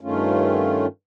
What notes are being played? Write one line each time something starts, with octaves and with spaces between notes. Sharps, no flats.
G2 D#3 A3 C#4 F4